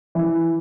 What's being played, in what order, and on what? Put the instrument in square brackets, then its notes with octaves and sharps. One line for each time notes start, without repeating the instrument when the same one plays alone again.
[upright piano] E3